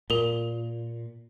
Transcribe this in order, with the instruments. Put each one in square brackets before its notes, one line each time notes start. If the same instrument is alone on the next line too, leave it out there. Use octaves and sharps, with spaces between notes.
[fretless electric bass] A#2 [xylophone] A#4 G7